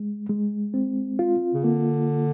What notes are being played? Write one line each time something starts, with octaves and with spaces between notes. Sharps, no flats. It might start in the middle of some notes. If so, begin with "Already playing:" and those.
Already playing: G#3
G#3
C4
F4
C#3
D3 A#3